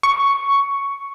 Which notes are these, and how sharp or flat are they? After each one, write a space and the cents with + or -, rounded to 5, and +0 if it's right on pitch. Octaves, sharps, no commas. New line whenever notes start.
C#6 +5